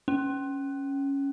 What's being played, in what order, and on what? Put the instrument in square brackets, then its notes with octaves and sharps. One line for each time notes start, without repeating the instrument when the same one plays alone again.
[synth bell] C#4